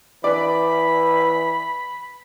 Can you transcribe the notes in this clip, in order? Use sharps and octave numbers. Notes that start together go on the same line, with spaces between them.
E3 B4 D5 B5